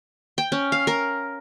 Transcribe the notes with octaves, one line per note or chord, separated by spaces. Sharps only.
G5
C#4
F5
A#4